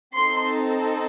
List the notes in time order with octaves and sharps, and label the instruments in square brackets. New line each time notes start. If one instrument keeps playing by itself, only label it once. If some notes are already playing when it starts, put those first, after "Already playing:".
[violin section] C4 D#4 A4 C6